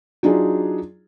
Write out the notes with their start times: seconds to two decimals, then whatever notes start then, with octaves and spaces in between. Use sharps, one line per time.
0.23 F#3 D4 D#4 F4 G#4